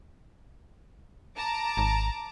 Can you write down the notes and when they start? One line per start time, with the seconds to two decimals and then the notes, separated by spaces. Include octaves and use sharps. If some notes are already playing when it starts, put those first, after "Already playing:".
1.36 A5 A#5 D6
1.77 G#1